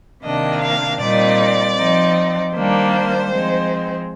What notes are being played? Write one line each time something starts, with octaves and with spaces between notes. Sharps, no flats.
C3 D#3 A#3 D4 D#5
F5
A#2 G3 C4 D#4 D5
F3 C4 D#4
D#3 G3 A#3 D4 C5
F3 G#3 C4 D#4